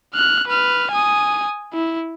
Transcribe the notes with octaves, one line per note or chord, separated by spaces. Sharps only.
F6 F#6
B4 F6
G#5 D#6
E4